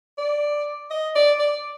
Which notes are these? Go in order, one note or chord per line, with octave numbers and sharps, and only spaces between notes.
D5
D#5
D5
D5